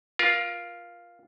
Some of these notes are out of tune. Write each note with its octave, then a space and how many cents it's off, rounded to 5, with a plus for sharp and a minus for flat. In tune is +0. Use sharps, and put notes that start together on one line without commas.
F4 +0 A#4 +30